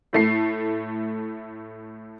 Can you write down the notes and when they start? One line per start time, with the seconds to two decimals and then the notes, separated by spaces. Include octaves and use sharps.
0.13 A2 A3 C7